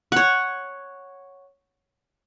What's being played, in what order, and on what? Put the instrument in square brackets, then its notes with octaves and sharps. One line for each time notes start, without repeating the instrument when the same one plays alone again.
[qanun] C#5 F#5